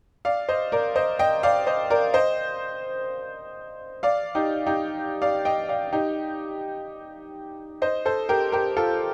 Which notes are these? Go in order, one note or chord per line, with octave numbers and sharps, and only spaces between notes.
D5 F5
C5 D#5
A#4 D5
C5 D#5
D#5 G5
D5 F5
C5 D#5
A#4 D5
C5 D#5
D5 F5
D#4 G4
D#4 G4
D5 F5
D#5 G5
D5 F5
D#4 G4
C5 D#5
A4 C5
G4 A#4
G4 A#4
F4 A4